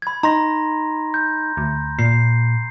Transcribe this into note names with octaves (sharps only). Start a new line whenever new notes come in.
B5 G#6
D#4 A#5 C6 A#6
G6
D2
A#2 C7